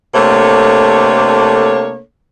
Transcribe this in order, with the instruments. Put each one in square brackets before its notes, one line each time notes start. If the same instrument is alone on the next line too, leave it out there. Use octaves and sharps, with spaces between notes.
[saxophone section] C3 A3 A#3 D4 A4 C#5